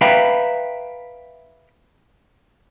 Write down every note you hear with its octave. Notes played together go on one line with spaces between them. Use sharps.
B4 E5 F5 G5 A#5 B5